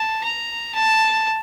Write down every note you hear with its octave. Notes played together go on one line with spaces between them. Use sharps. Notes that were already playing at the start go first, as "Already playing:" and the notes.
Already playing: A5
A#5
A5